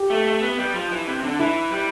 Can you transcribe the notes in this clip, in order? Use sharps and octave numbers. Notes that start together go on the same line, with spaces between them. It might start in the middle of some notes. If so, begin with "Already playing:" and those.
Already playing: G4
A3
A3
B3
G3
F3
E3
C3
D3
E3 E4
G3